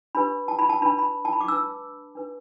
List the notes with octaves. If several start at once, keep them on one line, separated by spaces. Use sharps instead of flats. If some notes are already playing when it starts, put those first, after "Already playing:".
D4 G4 B4 B5
A5
B5
A5
D4 B4 B5
B5
A5
B5
D6
D4 B4 E6
D4 B4